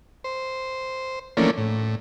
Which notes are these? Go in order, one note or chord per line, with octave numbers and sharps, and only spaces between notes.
C5
E3 F3 A3 A#3 C#4 D4
A2